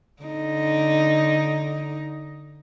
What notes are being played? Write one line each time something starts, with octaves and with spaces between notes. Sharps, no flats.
D3 D#4